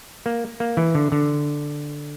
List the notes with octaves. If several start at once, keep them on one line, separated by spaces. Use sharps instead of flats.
A#3
A#3
E3
D3
D3